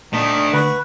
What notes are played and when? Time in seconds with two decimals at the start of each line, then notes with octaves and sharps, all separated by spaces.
0.13 A#2 D#3 A3 D4 D#5
0.53 D3 F#4 B4